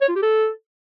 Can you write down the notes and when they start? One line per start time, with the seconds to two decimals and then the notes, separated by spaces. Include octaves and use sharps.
0.01 C#5
0.08 F4
0.15 G4
0.22 A4